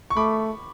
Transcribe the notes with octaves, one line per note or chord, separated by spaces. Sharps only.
C#6
A3 B5 D6